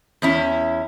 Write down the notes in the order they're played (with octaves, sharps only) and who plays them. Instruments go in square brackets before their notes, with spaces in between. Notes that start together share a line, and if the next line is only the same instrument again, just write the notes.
[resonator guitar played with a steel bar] E2 C#4 E4